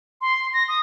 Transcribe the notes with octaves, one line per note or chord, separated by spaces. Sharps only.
C6
A#6
D#6